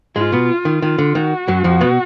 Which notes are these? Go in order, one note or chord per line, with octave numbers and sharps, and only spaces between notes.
G#2 G#3 F4
B2 B3
D#3
D#3 F4
D3
D#3 F#4
F#2 F#3
F2 F3
B2 B3